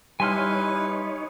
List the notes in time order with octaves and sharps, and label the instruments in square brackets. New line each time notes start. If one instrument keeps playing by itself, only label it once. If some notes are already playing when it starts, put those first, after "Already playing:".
[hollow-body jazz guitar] G3 [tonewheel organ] D#4 C#5 [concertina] E4 B4 [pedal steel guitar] G#5 C6 F6